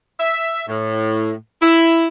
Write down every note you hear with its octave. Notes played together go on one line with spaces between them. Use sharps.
E5
A2
E4